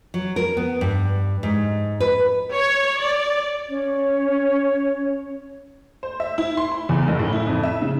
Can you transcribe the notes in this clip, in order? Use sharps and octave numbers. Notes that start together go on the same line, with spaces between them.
F#3
A#4
B3
G2
G#2
B4
C#5
D5
C#4 C#5
C5
E5
E4
C6
B5
E2
F#1
A2
E4
F2
E5
C#3